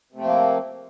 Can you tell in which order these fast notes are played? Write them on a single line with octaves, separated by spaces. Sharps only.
C3 A3 C4 F3 A#3